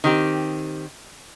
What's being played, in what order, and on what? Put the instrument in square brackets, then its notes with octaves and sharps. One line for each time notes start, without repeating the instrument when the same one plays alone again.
[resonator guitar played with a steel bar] D#3 C4 G4